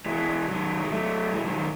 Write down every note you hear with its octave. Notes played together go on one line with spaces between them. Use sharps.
E3 G#3
D#3 F#3
G#3
F#3 A3
E3 G#3
D#3 F#3
D#3 F#3